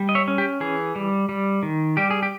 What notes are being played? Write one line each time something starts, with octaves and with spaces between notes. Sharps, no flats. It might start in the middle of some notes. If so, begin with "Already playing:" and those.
Already playing: G3
D#5
C#5 E5
C#4
G4
E3 G#4
G3
G3
D#3
G3 G4
G#4
G4